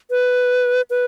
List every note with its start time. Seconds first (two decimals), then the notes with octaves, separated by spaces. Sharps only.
0.10 B4
0.90 B4